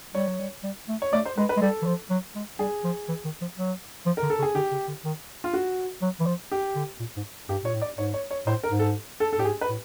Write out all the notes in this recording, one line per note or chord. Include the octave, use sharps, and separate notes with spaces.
G3 C#5
F#3
G3
G3
A3
C#5
A3 D5
C5
G#3 B4
B4
G#3
G3 A4
E3
F3
F#3
G#3
G3 G#4
F3
E3
D#3
F3
F#3
F3
A#4
D3
A4
C#3
G#4
D3 G4
C#3
D3
D#3
F4
F#4
F#3
E3
F3
G4
D3
A#2
G#2
G2 G4
A#2 C#5
A2
D5
G#2 C#5
C#5
C#5
A2 C5
A#4
G#2
A4
A4
A4
A2 G4
G#2 G#4
B4
A2